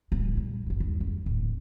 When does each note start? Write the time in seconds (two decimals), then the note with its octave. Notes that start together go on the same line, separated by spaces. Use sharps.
0.12 D1 D2
0.35 A#1 G3
0.66 G1 G2
0.80 D#2
1.00 F#1
1.26 D1